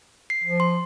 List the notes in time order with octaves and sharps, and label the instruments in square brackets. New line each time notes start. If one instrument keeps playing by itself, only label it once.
[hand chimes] C7
[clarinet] F3
[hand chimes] C6